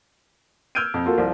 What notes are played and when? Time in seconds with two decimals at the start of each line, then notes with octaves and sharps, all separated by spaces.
0.75 E6 F6 G6 G#6 D7 D#7
0.94 F2
1.05 A#3 F4 F#4 A4
1.18 C2 F3